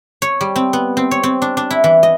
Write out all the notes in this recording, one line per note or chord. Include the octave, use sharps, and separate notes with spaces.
C#5
G3
C4
B3
C4
C#5
C4
D4
D4
E4
E3
D#5